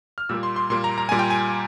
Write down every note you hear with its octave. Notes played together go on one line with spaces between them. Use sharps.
F6
A#2 G3 A#3 E6
C6
C6
A#2 G3 A#3 C6
A#5
A#5
A#2 G3 A#3 G#5
G5
G#5